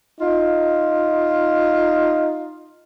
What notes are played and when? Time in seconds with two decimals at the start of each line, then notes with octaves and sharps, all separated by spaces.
0.21 D#4 F4